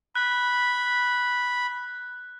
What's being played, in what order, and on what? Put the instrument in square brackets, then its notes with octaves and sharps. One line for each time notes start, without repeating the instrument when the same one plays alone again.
[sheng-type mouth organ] B5 [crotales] F#6